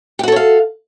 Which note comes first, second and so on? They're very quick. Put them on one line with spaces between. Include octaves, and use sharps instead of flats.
G4 F#4 A4 C#5 F5